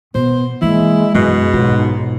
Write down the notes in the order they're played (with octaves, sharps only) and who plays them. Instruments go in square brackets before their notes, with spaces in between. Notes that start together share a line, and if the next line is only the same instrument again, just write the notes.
[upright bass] B2 [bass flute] B3 [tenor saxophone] C5
[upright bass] E3 A#3 [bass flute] G#3 [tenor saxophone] E4
[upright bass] F#2 [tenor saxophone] B2
[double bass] B1 G#2 [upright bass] F4